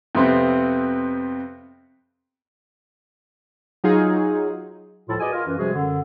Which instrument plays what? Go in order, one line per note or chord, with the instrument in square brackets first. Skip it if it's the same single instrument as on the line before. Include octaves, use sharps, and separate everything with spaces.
[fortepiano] F2 C3 B3 C4
[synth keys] F#3 D#4 F4 G#4
[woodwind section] C#2 A2 F3 E4 F4 A4
F#4 G#4 B4 D5 D#5 G#5
F4 A#4
F#2 E3
C3 F3 G3 G#3 F#4 G#4
F#2 D3